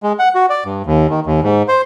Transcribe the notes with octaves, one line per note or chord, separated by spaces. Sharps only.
G#3
F#5
F#4
D5
G2
D#2
D#3
D#2
G#2
C5